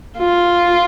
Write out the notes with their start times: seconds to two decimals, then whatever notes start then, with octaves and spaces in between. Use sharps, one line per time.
0.18 F4